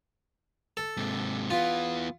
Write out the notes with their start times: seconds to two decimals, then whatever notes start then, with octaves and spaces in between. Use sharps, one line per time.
0.77 A4
0.97 G#2 C3
1.50 E3 B3 F4